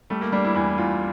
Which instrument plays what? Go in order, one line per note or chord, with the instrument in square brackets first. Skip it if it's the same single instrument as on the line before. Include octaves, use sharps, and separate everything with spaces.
[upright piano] G3 [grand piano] A3
[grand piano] A#3
[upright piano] G3 [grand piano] D4
[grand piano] E4
[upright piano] E2 [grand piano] E4
[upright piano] E2 [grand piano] F4